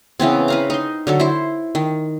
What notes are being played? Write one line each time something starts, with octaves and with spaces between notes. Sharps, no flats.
C#3 E3 B3 C4
B4 F5 A#5
D#4 C6
D3 F#3 A4
E4 C5
D#3